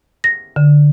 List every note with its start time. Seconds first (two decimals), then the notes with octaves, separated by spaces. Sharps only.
0.24 A#6
0.56 D3